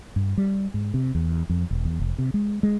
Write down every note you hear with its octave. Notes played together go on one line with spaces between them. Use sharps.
G2
G3
G#2
C3
E2
F2
E1
E2
F1
C3
G#3
G#3